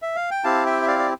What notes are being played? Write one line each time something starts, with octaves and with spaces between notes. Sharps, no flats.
E5
F5
G5
C4 E4 G4 F5 A5
E5 G5
E5
D5 F5
D5